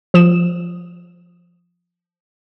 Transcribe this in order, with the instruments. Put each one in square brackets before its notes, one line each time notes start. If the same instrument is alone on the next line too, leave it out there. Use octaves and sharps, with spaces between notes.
[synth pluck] F3 D#6 E7